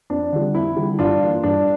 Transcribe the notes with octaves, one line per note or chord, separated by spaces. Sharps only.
F2 D4
D3 G3
F2 E4
D3 G3
G2 D4 F4
E3 A#3
G2 D4